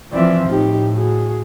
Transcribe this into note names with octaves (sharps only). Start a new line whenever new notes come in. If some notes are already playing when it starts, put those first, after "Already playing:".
E3 F3 C4 D5 E5
A2 D#4 G4
F#4 G#4